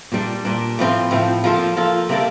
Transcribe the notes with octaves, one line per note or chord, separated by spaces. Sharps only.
A#2 G3 D4
A#2 G3 D4
A2 F3 C4
A2 F3 C4
F3 A#3 F4 A4
F3 A#3 F4 A4
C3 G3 A#3 D4 A4